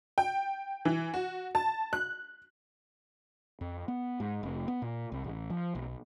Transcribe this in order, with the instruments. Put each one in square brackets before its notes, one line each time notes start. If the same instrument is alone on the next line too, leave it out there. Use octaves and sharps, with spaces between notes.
[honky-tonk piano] G5
E3
F#4
A5
F#6
[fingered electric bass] F2
B3
G#2
F1
B3
A#2
C2
A1
F3
B1